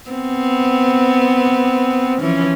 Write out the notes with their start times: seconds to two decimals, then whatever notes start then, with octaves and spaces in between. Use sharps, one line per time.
0.10 B3 C4
2.21 E3 F3 C#4